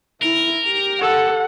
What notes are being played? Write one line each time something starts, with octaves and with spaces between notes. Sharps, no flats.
E4 A#4
G4
A4 F#5